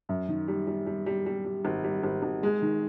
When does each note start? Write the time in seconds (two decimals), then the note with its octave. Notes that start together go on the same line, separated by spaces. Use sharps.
0.09 F#2
0.28 D#3
0.48 G3
0.67 G3
0.86 G3
1.06 G3
1.26 G3
1.45 G3
1.65 G#1
1.84 G3
2.03 G#1
2.22 G#1
2.43 G#3
2.62 D#3